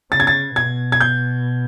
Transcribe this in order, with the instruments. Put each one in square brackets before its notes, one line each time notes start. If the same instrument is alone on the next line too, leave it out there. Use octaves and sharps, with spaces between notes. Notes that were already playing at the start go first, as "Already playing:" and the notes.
[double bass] C#3 [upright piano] A6
[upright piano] G#6
A6
[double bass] B2 [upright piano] G#6
[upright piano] G#6
G6